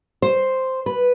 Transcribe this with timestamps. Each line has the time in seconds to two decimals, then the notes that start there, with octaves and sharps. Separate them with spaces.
0.22 C5
0.86 B4